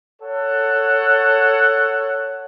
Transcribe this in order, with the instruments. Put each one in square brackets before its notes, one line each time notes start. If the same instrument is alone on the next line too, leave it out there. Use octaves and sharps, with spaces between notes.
[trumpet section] A4 C#5 F#5